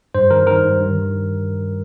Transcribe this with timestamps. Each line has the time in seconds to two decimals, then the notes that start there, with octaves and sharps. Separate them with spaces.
0.15 G2 C5
0.31 D#3 A#4
0.47 D#3 A#4
0.63 G2
0.80 G2
0.96 D#3